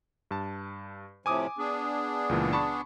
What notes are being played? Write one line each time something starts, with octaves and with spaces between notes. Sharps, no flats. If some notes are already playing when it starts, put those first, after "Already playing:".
G2 A5
A2 C3 F3 G#5 D6 D#6
B3 D4 G#4
C#2 A#2 E3
A5 B5 C#6